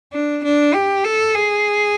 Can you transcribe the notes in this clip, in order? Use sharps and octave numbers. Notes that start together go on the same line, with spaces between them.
D4
D4
G4
A4
G#4